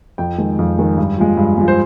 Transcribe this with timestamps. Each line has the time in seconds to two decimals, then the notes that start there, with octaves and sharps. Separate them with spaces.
0.18 F2 G5
0.38 D#3 G#3
0.59 F2
0.78 D#3 G#3
0.97 G2
1.18 F3 G#3
1.37 G2
1.58 F3 G#3
1.68 C5